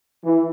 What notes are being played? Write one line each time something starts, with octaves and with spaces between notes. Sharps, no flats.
E3